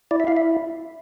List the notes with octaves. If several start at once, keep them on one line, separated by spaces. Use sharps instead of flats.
E4 D5
E5
E4 F5
E5